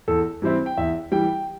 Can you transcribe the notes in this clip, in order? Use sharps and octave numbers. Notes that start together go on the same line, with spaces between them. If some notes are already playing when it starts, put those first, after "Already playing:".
E2 A4
E3 G3 C4 E4
G5
E2 E5
E3 G3 G5